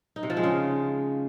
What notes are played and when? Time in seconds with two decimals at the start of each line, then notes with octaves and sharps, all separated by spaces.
0.16 D#4
0.23 C3
0.30 F3
0.37 G#3
0.44 C#3